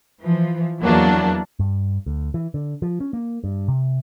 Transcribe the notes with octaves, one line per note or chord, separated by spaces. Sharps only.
E3 F3
E2 E3 F#3 A#3 D4
G2
D2
E3
D3
F3
C#4
A#3
G2
C3